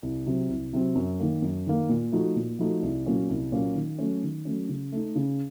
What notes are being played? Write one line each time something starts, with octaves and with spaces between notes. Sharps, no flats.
C2
C3 F#3 C4
C2
C3 F#3 C4
F#2
D#3 A#3
F#2
D#3 A#3
A#2
F3 A3 D#4 F#4
A#2
F3 A3 D#4 F#4
C2
A#2 F#3 A#3 C#4
C2
A#2 F#3 A#3 C#4
D#3
F#3 A3 C#4
D#3
F#3 A3 C#4
C#3
A3 D#4
C#3